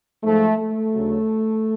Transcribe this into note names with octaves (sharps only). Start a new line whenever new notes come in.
G#2 F3 A3
A3
D2 C#3 F#3